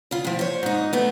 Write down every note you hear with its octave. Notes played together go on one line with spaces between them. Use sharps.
C#3 F4
A2 F3
C5 C#5
G#2 D#4
D3 A3 B3